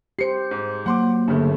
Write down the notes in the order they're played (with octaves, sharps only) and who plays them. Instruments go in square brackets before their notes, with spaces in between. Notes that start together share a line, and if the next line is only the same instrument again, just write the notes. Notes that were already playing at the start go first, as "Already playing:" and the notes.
[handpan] G4 C5 [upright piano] C7 C#7
[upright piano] G#2
[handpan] F#3 [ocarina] A#3 [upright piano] F#5 C6 D6
[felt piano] G1 [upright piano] C#3 G3 A3